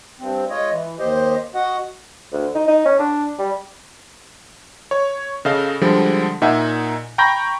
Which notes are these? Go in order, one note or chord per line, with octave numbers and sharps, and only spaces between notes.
G2 C4
G#3 F4 C#5 D#5
E3
D#2 G4 C5 D#5
F#4 D#5 F#5
D2
D#4
D#4
C#4
D4
G3
C#5
C#3 A4 D#5 F5
D3 F3 G3 G#3
A#2 D#4 E5 F#5 G#5
G5 A#5 B5 C#6 G6 A#6